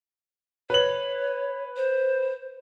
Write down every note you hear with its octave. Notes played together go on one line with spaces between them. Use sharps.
B4 C#5 F#7
C5